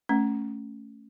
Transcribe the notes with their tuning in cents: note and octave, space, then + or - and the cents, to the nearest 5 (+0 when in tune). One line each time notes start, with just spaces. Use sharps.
A3 +0 C#4 +0